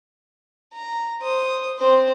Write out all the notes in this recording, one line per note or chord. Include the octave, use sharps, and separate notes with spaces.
A#5
C5 D#6
C4 C5